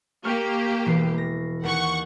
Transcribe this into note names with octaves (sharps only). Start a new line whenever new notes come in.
A#3 G4 C#6 F6
E1 E3 C7
A#6
D#2 F#5 C#6